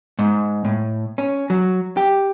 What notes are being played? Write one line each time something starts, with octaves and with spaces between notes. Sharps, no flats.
G#2
A2
C#4
F#3
G4